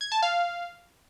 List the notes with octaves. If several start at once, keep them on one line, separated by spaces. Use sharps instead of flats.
G#6
A5
F5